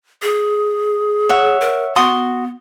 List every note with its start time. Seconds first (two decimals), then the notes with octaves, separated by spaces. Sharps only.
0.22 G#4
1.29 C#5 E5 F#5
1.61 A#4
1.96 B3 F#4 C6 D#6